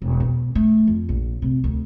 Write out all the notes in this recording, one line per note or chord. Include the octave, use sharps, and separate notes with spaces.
E1
B2
A3
F2
A#1
C3
D2